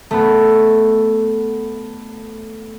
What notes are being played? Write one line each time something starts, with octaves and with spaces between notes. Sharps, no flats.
A3 B3